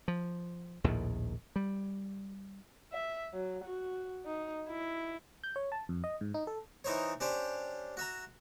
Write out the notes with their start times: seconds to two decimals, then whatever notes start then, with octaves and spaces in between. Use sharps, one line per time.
0.08 F3
0.84 A#1 D#2 A2 D#3
1.56 G3
2.92 E5
3.34 F#3
3.65 F#4
4.26 D#4
4.69 E4
5.44 G6
5.56 C#5
5.72 A5
5.89 F2
6.04 D#5
6.21 G#2
6.34 D#4
6.47 A4
6.84 E3 D#4 C5 C#5
7.20 C#4 D4 G4 C5
7.97 F#4 E5 A#5